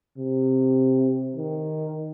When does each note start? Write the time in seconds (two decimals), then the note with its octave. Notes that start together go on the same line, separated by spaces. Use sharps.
0.17 C3
1.36 D#3